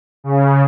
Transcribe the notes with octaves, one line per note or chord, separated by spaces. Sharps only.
C#3